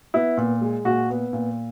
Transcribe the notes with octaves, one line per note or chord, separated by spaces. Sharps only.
B3 E4
A#2
G#3
A#2 F#4
B3
A#2